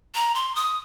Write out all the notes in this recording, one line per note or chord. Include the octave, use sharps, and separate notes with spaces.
A#5
C6
D#6